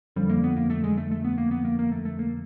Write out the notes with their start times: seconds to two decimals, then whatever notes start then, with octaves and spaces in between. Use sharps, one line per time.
0.16 F2 D3 F3 G3
0.29 A#3
0.44 B3
0.57 A#3
0.70 A3
0.84 G#3
0.98 A3
1.12 A3
1.25 B3
1.38 A#3
1.51 B3
1.65 A#3
1.79 A#3
1.92 A3
2.05 A3
2.19 A#3